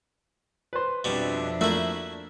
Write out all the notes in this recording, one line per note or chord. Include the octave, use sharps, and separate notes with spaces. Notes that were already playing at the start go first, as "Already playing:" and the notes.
B4 C5
F2 B2 G3 D4 E5
A3 A#3 E4 F#4 E6